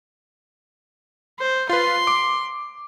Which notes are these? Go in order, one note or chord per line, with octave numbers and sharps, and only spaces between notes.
C5
F4 B4 C6
D6